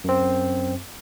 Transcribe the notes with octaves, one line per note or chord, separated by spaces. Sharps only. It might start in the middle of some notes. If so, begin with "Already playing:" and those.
F#2 C4